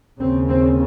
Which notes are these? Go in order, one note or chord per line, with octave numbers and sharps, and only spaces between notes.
D#2 C#3 C4
C4